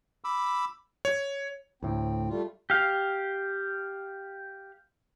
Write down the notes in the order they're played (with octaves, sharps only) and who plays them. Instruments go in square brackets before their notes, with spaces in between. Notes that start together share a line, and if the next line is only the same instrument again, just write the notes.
[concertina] B5 D6 E6
[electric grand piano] C#5
[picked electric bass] D2 A2 [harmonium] C4
[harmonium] G3 A3 F4
[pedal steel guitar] G4 F5